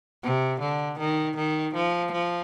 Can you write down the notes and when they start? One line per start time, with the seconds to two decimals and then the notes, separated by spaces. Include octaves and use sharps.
0.23 C3
0.61 D3
0.99 D#3
1.37 D#3
1.75 F3
2.12 F3